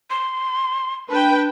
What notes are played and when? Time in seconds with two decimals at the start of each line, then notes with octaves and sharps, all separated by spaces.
0.10 C6
1.10 D4 B4 G5 A5